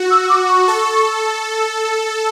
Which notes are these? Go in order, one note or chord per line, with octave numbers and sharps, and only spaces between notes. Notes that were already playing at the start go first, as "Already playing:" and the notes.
Already playing: F#4
E6
D6
C#6
A4